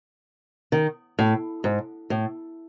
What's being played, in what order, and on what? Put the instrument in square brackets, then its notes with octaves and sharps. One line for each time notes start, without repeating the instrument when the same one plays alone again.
[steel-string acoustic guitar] D#3
A2
G#2
A2